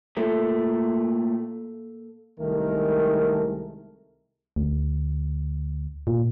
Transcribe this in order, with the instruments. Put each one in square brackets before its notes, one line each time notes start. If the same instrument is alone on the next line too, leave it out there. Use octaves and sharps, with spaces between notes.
[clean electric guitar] A#2 A3 [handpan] A#3 A4
[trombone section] C2 D#3 G#3 A3 A#4
[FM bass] D2
A#2